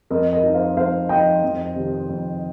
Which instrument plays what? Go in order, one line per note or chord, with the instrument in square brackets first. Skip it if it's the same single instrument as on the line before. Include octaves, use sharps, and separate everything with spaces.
[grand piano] F2 [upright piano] A#4 D#5
[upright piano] A#4 D#5
[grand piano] F3 D#4
[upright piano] C5 F5
[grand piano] F2 [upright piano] C5 F5
[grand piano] F3 D#4 [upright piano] D#5 G5
[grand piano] F2
C3 D#3
F2